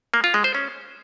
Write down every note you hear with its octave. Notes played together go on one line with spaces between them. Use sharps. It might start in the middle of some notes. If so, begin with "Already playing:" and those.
A#3
F4
G#3
C5
C#4